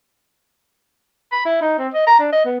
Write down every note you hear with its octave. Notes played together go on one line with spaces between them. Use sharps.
B5
E4
D#4
C4
D#5
A#5
D4
D#5
B3